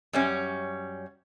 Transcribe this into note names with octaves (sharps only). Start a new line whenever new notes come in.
F#2 G3 C#4